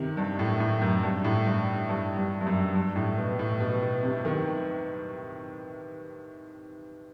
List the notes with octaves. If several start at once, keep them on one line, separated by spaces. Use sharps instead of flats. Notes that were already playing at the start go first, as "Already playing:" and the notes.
Already playing: C3 D#3
G2
A2
A2
F#2
G2
A2
G2
G2
G2
G2
F#2
G2
A2
B2
A2
B2
B2
C3
D#3